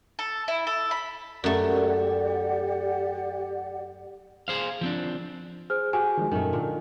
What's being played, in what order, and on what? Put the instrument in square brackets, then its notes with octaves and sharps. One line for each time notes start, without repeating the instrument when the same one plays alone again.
[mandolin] A4
E4
A4
B5
[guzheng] F#2 A3 [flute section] G4 D5 F#5
[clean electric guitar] G#4 C5 F5
F3 C4 D4
[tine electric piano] G#4 [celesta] C5 F6
[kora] F#4 G4 [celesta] G#5
[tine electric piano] D#3 F3 G#3
[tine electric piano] F#2 A#2 [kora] D#3 A3
[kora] A#2 [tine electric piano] D3